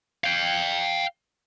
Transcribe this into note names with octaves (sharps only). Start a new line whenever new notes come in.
F5 G5